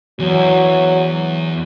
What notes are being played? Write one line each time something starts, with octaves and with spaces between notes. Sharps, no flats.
E2 F#3